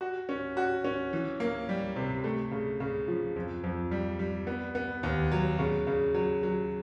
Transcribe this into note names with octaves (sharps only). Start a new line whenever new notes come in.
F#4
C#4
F#4
C#4
E3
A#3
G3
C3
A3
C#3
C#3
F3
F2
F2
G3
G3
B3
B3
D#2
F#3
C#3
C#3
F#3
F#3